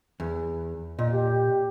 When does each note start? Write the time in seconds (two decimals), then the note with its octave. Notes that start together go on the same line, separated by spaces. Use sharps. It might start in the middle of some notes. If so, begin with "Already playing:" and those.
0.20 E2
0.99 A#2 D#5
1.12 G4